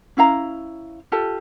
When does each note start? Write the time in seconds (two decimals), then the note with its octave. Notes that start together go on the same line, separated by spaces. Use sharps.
0.17 C#4 E4 F5 A#5
1.12 F4 G4 A4 A5